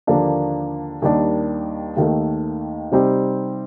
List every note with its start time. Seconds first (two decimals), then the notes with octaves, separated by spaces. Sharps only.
0.07 D#2 D3 F3 A#3 D4
1.02 D#2 D#3 G3 D4
1.96 D#2 D#3 A3
2.92 C3 G3 C4 D#4 G4